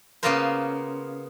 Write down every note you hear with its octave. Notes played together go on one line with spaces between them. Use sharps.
C#3 A#3 B3 F4 A#4 C5